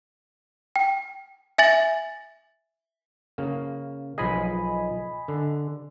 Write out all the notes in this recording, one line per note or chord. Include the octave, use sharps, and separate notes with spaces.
G5
E5 G#5 A6 F#7
C#3 A#3
B1 F3 G#4 D#5 G#5 B5
D3